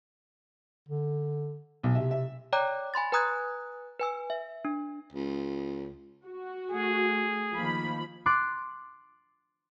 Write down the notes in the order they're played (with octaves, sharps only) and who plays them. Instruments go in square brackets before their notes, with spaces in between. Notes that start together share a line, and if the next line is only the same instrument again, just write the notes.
[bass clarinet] D3
[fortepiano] B1
[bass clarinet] C3 [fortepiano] E5
[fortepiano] E5
[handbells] C#5 D5 G5 A#5 D6 F#6
G#5 B5 C6 A6
B4 G#5 A#5 D#6 F#6 G#6
B4 G#5 E6
E5
D4
[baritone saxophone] C#2
[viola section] F#4
[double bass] A3 [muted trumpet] G#4
[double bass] D#3 A#3 [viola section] F3 B5
[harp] C6 D6 F#6 A6 C7